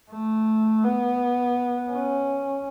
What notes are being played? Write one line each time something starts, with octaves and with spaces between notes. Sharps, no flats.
A3
B3
C#4